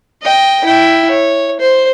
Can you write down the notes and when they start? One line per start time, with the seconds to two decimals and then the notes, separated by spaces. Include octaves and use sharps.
0.22 D#5 G5
0.64 E4 G5
1.10 C#5
1.60 C5